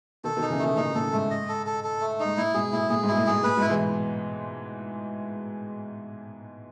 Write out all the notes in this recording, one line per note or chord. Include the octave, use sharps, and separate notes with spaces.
B2 D#3 A4
B2 D#3
D#4
C#3 E3
B2 D#3 A3
A2 C#3 D#4
A2 A4
G#2 A3
D#5
A4
A4
A4
A3
D#4
G#2
A2 E4
G#2 B2 G#4
A2 E4
A2 G#4
G#2
B2 E4
A2
G#2 G#4
A2 B4
G#2 B2
E4
E3 G#3